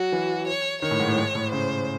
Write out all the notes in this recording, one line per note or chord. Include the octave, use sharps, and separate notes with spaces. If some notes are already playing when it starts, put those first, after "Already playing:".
Already playing: F#3 F#4
E3
C#5
D#3 C#5
A2
G#2
A2
G#2
A2
C#3 C5